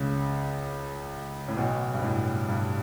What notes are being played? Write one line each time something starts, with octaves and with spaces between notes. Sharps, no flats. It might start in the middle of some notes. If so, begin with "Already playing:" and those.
Already playing: C#2 C#3
A2
B1 B2
G2
A2
G2